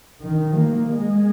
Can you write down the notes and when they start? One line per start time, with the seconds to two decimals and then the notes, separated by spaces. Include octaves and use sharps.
0.21 D#3
0.56 A#3
0.91 G#3